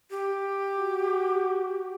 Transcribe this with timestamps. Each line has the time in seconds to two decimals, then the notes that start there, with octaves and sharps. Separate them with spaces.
0.10 G4
0.78 F#4